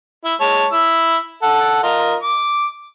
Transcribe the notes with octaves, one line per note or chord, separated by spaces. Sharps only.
E4 E5
G#3 C#5 A5
E4 E6
A4 F#5
F4 A#4 D#5
D6